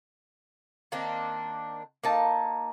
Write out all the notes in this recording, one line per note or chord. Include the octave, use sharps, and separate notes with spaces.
D#3 A#3 C4 D4
A#3 D#4 A5